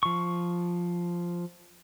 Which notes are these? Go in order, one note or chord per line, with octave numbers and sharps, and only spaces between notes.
F3 C#6